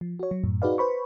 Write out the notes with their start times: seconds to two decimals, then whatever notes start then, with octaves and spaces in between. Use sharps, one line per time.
0.01 F3
0.19 F#4 C#5
0.31 F#3
0.44 F#2 A2
0.62 D#4 F#4 G#4 B4 D5 F5
0.78 B4 C5 B5 C#6